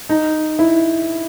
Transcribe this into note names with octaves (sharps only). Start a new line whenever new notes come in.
D#4
E4